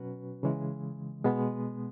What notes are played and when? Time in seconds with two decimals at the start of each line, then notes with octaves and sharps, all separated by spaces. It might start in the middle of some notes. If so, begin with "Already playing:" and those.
Already playing: B2 F#3 C#4 F#4 B4
0.43 C#3 E3 G#3
1.25 B2 G#3 B3